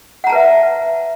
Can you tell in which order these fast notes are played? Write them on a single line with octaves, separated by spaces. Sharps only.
F#5 A#5 A5 B4 E5